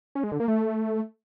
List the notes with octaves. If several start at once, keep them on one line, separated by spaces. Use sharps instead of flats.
C#4
G#3
D3
A#3
A3